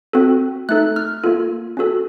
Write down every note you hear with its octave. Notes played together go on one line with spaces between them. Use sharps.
C4 F#4 A4
A3 D#4 A4 F#6
F6
A#3 F4 A4
C#4 F#4 A4